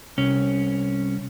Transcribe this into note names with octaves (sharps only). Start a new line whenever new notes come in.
C2 C#4